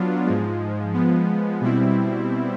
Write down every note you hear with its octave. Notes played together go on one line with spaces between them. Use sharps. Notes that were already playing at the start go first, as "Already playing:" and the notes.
Already playing: F#3 B3 D4 F4
G#2 F3 G#3
F3 G#3 B3
B2 G3 C4 E4